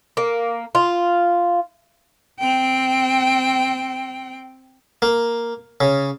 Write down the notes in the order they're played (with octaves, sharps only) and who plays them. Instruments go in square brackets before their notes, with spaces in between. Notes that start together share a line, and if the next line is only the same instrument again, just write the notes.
[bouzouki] A#3
F4
[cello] C4 G5
[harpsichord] A#3
C#3